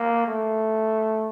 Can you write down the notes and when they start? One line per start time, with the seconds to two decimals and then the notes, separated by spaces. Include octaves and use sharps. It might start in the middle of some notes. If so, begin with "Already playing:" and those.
Already playing: A#3
0.27 A3